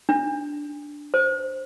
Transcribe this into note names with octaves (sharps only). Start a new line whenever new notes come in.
D4
C5